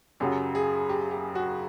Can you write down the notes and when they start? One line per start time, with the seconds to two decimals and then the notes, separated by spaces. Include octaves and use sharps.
0.20 F#2 C#3 F#3 G4
0.55 G#4
0.89 G4
1.11 G4
1.35 F#4